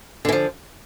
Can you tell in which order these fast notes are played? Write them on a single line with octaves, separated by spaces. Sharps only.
D3 E3 F3